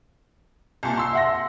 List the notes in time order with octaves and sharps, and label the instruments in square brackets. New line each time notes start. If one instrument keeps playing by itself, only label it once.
[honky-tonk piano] C2 A#2 [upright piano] G#5 A5
[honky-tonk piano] C6 E6 C7
[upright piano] E5 F#5 A#6